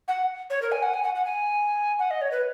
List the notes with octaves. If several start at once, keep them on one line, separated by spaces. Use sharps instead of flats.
F#5
C#5
A#4
G#5
F#5
G#5
F#5
F#5
G#5
F#5
D#5
C#5
B4